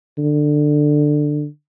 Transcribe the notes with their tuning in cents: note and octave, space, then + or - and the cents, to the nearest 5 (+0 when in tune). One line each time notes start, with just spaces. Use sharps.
D3 +15